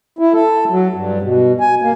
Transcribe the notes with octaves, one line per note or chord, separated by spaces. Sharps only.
E4
A4
F#3
G2
B2
G#5
A#3